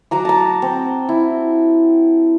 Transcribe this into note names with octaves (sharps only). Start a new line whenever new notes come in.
F#3 F#4 A#5 D6
A5 A#5
C4
E4